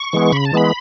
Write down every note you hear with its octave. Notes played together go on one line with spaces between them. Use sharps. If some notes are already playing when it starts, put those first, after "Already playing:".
Already playing: C#6
E3 G#3 B3
C#3 B5
A5
E3 G#3 B3 B5